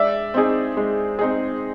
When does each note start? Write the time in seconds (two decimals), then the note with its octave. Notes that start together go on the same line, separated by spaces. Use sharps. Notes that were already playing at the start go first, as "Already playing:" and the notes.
Already playing: G#3 D5 E5
0.34 C4 D#4 G#4
0.77 G#3
1.19 C4 D#4 G#4